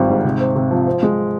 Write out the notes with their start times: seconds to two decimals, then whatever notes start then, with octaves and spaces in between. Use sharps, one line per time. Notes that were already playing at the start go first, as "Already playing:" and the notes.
Already playing: G#1 F3 G3 C4
0.10 G#2
0.24 C3
0.40 C4
0.56 C3
0.71 F3
0.87 C4
1.03 G#3